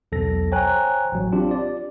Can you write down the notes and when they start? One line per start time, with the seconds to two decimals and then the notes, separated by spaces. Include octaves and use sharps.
0.12 B1 E2 A4 A#6
0.52 C5 C#5 G5 G#5 A#5 F#6
1.12 A1 F#3
1.32 C4 D4 F4 G4
1.51 D5